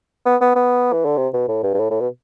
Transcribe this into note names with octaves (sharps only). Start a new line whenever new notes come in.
B3
B3
B3
E3
D3
C3
B2
A2
G2
G2
A2
A2
B2